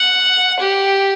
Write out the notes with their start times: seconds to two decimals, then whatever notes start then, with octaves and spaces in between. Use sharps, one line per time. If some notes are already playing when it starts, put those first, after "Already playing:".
Already playing: F#5
0.60 G4